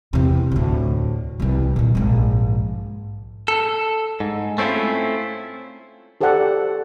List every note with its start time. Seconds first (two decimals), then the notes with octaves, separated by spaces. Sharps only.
0.13 E2 C3
0.52 D2 A2
1.40 C2 E3
1.76 A#2 D#3
1.95 A#1 G#2
3.48 A4
4.20 G#2
4.58 A3 C4 C#4 E4 F4
6.21 G4 A4 C5 D5 F#5